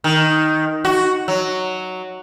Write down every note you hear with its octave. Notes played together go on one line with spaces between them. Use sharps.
D#3
F#4
F#3